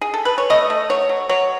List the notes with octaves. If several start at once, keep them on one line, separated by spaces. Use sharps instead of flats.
G#4
A4
B4
C#5
A3 D#5
A3
F#3 C#5
F#3
F#3 C#5